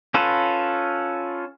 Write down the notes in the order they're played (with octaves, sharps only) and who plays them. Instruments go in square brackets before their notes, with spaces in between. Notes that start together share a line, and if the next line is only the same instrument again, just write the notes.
[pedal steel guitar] C#4 F4 A4 B4